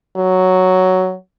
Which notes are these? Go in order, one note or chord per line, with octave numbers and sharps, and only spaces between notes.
F#3